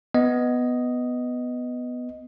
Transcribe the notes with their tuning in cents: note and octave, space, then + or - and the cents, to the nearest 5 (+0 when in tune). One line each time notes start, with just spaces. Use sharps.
B3 +5 D#5 +0